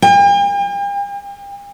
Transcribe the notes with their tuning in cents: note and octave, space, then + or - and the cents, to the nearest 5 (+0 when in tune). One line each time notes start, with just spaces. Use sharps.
G5 +45